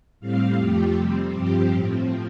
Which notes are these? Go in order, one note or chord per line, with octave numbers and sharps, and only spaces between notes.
A2 G3 C4 F5
F2 F3 A3 G4
C3 G3 C4
G2 F3 C4 G4
A2 F3 C4